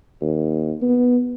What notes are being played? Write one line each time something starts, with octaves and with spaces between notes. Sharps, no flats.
D#2
B3